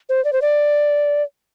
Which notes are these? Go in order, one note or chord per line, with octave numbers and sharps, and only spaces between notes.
C5
D5
C5
D5